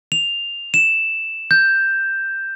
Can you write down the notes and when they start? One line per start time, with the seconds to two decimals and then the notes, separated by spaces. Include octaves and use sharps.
0.12 F7
0.74 E7
1.51 G6